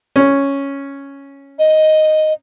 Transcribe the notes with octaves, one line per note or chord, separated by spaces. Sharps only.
C#4
D#5